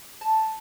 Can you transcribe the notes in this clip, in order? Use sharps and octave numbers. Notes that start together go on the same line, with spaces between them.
A5